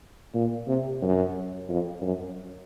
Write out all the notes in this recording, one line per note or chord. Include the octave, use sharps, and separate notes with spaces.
A#2
C3
F#2
F2
F#2